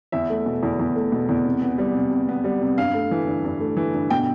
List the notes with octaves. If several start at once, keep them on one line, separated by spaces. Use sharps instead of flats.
E2 E5
A3
B2
E2
E2
A3
B2
E2
C3
B3
G3
C3
C3
B3
G3
C3
G2 F5
A3
E3
G2
G2
A3
E3
G2
B2 G5